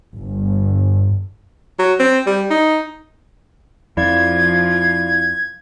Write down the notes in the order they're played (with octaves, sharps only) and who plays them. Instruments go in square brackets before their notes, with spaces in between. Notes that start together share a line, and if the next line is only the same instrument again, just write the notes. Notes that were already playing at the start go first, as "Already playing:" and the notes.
[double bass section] G1
[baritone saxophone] F#3
C4
G3
D#4
[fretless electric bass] F2 [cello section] F3 F4 [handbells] E4 D5 F5 [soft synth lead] G#6